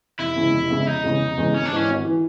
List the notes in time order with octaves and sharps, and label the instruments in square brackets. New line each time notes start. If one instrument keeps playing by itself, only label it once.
[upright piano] F1 [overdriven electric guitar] E4
[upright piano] E2 C#3 E3 G#3
F1
E2 C#3 E3 G#3
[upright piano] F1 [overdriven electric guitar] D#4
[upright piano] E2 C#3 E3 G#3
F1
E2 C#3 E3 G#3
[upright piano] G#1 [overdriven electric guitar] C#4
[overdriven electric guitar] D4
[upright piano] G#2 E3 [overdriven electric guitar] C#4
[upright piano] G#1
E3